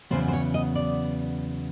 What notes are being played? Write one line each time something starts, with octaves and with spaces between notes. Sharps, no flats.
E2 C#3 F#3 B3 C5
C5
C#5
D#5
D5